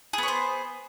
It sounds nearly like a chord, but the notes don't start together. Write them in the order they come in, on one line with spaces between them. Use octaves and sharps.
G#4 B3 C#5 C5